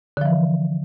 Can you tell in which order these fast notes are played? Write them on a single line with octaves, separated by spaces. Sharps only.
D3 F3 E3